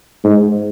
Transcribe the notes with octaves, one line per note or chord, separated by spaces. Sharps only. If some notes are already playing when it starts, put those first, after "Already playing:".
G#2